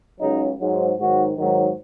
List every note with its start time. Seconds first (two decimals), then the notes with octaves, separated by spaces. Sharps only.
0.20 C#2 C#3 F#3 D#4
0.60 G#2 F#3
0.98 G#2 D#3 F#3 F#4
1.38 G#2 D#3 F#3